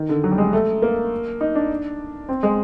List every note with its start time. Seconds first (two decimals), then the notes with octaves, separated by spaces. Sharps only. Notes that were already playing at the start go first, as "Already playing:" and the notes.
Already playing: D#3
0.09 D3
0.24 F#3
0.31 G3
0.38 G#3
0.53 A3
0.82 A#3
1.41 D#4
1.55 D4
2.29 C4
2.43 G#3